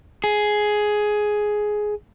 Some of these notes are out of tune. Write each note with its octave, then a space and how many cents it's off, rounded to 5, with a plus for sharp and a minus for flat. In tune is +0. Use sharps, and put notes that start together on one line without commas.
G#4 +10